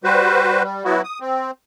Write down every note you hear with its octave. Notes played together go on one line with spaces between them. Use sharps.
G3 F#4 B4 C5
G3
F#3 B3 E4 F#4
D#6
C4